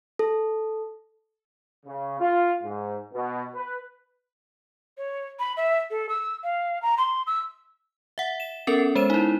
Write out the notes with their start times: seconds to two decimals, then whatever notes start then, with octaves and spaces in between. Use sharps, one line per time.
0.19 A4
1.85 C#3
2.19 F4
2.63 G#2
3.13 B2
3.54 B4
4.97 C#5
5.39 B5
5.57 E5
5.90 A4
6.09 E6
6.43 F5
6.82 A#5
6.98 C6
7.27 E6
8.18 E5 F#5
8.40 E7
8.67 B3 C#4 A4 A#4 A6
8.96 G#3 C5 E7
9.10 D#4 E4